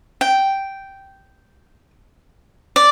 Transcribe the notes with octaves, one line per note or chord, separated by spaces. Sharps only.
G5
D5